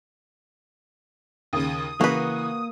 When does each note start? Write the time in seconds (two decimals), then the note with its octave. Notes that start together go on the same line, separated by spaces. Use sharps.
1.53 D#2 C#3 D#6
2.01 C#3 E3 A#3 F#4 B4